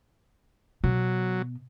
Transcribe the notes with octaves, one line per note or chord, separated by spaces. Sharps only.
B2 F#3